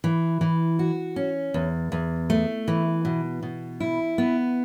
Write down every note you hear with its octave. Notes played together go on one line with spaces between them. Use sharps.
E3
E3
F#4
C#4
E2
E2
A3
E3
B2
B2
E4
B3